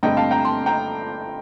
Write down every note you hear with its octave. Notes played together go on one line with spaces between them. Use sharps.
G2 D3 A3 C4 D#5 G5
F5 A5
G5 A#5
A5 C6
G5 A#5